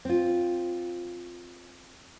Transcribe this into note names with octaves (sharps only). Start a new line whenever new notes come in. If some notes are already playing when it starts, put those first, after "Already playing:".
C4 F4